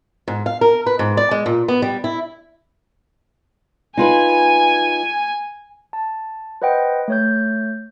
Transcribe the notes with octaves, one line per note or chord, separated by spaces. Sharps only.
G#2
F5
A#4
B4
G#2
D5
G#3
A#2
B3
G3
E4
D#4 F4 B4 G#5
A5
B4 C5 D#5 F#5 G5
A3 C#5 G6